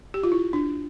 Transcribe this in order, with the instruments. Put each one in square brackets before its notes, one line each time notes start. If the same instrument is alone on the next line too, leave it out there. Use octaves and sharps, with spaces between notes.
[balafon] G4
F4
E4
D4